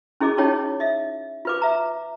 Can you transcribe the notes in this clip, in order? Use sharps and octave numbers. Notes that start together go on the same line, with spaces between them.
C#4 E4 G#4 D#5 D6
C#4 D#4 F4 C#5 D#5 G5
D#5 E5
F4 B4 D6
E5 A#5